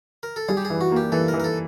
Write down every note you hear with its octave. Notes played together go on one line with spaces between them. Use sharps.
A#4
A4
G3 G#4
G4
G#4
E3
F#4
A#3 G4
E3 A4
A#4
E3
A#4
A4